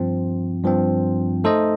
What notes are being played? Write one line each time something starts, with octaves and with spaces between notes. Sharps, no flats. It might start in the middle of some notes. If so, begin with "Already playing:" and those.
Already playing: G2 F3 C4
G2 F3 C4
A3 D#4 A4 C5 D#5